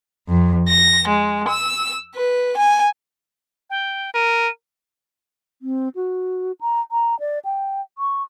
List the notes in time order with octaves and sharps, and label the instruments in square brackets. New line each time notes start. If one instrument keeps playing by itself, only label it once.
[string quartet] F2
A#6
G#3
E6
B4
G#5
[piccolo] G5
[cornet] A#4 [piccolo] D#7
[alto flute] C4
F#4
A#5
A#5
D5
G5
C#6